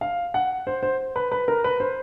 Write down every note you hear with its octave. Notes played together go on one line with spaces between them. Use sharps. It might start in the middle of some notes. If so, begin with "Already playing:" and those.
F5
F#5
C5
C5
B4
B4
A#4
B4
C5